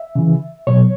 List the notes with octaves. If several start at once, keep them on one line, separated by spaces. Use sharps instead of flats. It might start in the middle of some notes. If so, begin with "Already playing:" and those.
Already playing: E5
C#3 E3
B2 F#3 C#5